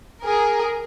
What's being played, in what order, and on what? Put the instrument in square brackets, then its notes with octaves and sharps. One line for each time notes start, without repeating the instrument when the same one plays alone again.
[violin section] G#4 A#4